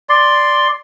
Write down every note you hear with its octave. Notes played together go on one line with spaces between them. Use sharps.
D5 C6